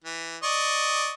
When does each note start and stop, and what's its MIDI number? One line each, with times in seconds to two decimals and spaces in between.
0.04 0.37 52
0.43 1.11 74
0.43 1.11 75
0.43 1.11 85